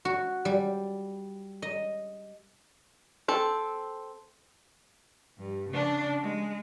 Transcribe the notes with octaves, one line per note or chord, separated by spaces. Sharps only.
F#4
G3
D#5
C4 A4
G2
C#3 D4
G#3